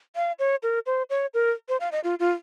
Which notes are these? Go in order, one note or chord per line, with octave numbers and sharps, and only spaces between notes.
F5
C#5
A#4
C5
C#5
A#4
C5
F5
D#5
F4
F4